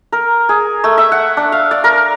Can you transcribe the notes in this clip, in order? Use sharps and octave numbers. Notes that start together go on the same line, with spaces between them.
A#4
G#4
A3
E5
F#5
D4
F5
D5
A#4